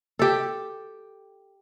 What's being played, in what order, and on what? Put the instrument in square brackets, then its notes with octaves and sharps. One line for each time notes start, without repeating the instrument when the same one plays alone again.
[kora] G4 A4